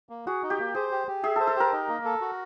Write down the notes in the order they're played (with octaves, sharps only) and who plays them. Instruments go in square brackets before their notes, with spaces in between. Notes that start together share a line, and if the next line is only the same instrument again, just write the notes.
[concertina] A#3
[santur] F#4 [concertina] G#4
[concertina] D#4
[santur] G4
[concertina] A#3
[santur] G#4 [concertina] C5
[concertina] G4
G4
[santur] G#4 [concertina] E5
[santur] A4 [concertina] C5
[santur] A4
[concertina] G4 [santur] A#4
[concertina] D#4
A#3
A4
F#4